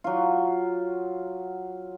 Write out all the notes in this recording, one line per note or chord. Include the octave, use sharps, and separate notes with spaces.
F#3 F4